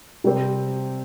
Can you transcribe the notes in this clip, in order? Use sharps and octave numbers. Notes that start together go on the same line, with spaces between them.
C3 G3 C4 G4 C5